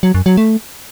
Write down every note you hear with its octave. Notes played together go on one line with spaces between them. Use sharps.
F#3
F#2
F#3
A3